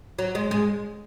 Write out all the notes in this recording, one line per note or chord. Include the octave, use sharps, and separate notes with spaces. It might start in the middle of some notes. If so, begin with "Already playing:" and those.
F#3
G#3
G#3